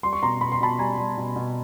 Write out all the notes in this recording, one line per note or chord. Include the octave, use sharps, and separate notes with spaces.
G3 C6
C#6
B2 A#5 C6
B2 B5
C6
B2 A5 B5
G3 G#5 A#5
G3
B2
B2